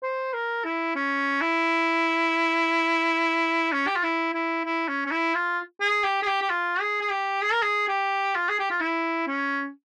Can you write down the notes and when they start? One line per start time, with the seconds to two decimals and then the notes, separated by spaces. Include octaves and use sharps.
0.03 C5
0.33 A#4
0.64 E4
0.95 C#4
1.41 E4
3.72 C#4
3.87 G4
3.95 F4
4.03 E4
4.33 E4
4.65 E4
4.88 C#4
5.06 C#4
5.11 E4
5.35 F4
5.80 G#4
6.04 G4
6.23 G#4
6.27 G4
6.42 G4
6.50 F4
6.80 G#4
7.01 G#4
7.11 G4
7.42 G#4
7.53 A#4
7.62 G#4
7.88 G4
8.35 F4
8.49 G#4
8.60 G4
8.70 F4
8.80 E4
9.27 C#4